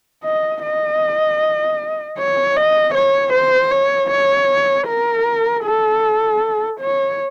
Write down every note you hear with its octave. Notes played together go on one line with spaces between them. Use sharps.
D#5
D#5
C#5
D#5
C#5
C5
C#5
C#5
A#4
A4
C#5